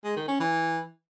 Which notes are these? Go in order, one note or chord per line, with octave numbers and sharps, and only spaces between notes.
G#3
D#3
C#4
E3